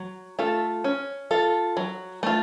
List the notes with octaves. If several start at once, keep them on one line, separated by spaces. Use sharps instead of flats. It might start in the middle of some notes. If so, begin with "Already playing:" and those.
Already playing: F#3
A3 F4 A4
C#4
F4 A4
F#3
A3 F4